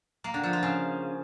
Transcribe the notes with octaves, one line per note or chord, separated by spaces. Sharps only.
A#3
D3
F3
F4
C#3